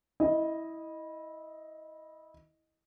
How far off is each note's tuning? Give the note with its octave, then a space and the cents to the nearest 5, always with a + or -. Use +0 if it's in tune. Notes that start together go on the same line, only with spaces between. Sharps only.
E4 -20 D#5 +0